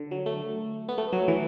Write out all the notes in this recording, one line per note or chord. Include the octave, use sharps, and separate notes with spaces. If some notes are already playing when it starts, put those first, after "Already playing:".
Already playing: D3
F#3
A3
B3
A3
F#3
E3